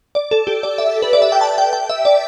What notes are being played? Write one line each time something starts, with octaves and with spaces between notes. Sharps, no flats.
D5
A4
G4
D5
E5
B4
D5
E5
G5
A5
G5
G5
E5
D5